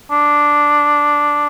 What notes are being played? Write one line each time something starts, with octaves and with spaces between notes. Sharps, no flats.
D4